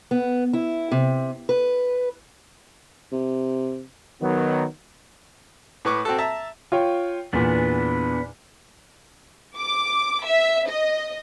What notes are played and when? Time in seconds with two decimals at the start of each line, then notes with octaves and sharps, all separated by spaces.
0.11 B3
0.53 E4
0.92 C3
1.49 B4
3.12 C3
4.22 D#3 F#3 B3
5.85 A2 B4 C#6 D6
6.05 C4 F#4 A4
6.18 E5 A5 A#5
6.72 F4 C#5 G5
7.33 E2 A#2 B3 D4 B4
9.57 D6
10.25 E5
10.69 D#5